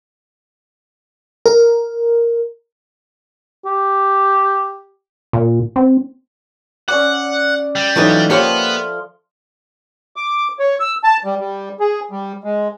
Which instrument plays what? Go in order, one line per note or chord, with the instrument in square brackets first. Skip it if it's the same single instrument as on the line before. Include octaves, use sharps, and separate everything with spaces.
[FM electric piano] A#4
[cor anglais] G4
[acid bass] A#2
C4
[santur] C#4 D5 D6 [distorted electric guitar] F#5
[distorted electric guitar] G3
[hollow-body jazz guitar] E3 F#3 D#4 [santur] A3 F4
[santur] F3 F5 C6 [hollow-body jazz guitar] A#3 G4 C#5 [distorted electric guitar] B3
[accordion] D6
C#5
E6
A5
G3
G3
G#4
G3
G#3